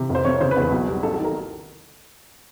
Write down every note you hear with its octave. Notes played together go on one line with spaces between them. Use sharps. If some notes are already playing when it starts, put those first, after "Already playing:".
Already playing: C3
F1
C5
F1 C#5
C#3 C5
B4
E2
B4
B1
G3
A1 A4
A4
D#3
A#4